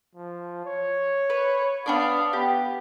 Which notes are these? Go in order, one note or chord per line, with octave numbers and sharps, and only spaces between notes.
F3
C#5
B4
B3 D4 D5 F5
B3 G4